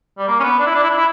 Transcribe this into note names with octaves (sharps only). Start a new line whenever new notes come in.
G3
A#3
C#4
B3
D4
E4
D4
E4
D4
E4